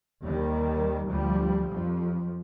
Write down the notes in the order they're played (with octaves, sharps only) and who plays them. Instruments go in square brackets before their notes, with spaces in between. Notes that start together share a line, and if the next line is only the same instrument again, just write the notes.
[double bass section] D#2 D#3 G3
D2 F3 G3
F2 F3